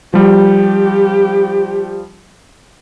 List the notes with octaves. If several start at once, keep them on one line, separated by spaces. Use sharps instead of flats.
F3 G3 G4